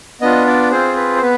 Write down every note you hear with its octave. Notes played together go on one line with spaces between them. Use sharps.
B3 D4 F4 D#5
D5
C4 F4 G#4 C5
B4
C5
B3 B4